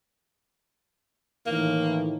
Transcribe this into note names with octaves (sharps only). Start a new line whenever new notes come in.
A2 D#3 E3 A#3